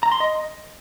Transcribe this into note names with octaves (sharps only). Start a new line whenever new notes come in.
A#5
C6
D#5